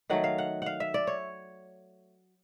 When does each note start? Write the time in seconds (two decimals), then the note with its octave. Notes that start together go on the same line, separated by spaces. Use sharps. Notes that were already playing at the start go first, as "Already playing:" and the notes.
0.10 D#3 F#3 A3 F#5
0.24 F5
0.38 F#5
0.62 F5 F#5
0.80 E5
0.94 D5
1.07 C#5